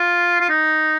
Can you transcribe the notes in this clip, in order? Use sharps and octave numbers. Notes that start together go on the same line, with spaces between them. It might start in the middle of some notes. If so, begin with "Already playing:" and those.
Already playing: F4
F4
D#4